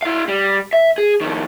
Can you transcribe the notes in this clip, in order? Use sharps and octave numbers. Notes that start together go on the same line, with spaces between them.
E4 F5
G3
E5
G#4
F2 D#3